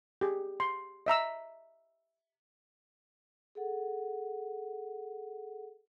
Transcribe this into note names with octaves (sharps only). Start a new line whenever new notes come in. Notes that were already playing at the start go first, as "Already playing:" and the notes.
G4 G#4
C6
D#5 E5 A#5 E6
G#4 A4 F#5